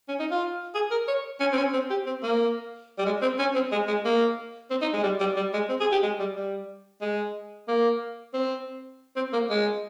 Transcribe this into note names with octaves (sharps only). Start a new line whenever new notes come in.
C#4
D#4
F4
G#4
A#4
C#5
C#4
C4
C#4
C4
G4
C4
A#3
G3
G#3
C4
C#4
C4
G#3
G#3
A#3
C4
D#4
G#3
G3
G3
G3
G#3
C4
G#4
G4
G#3
G3
G3
G#3
A#3
C4
C4
A#3
G#3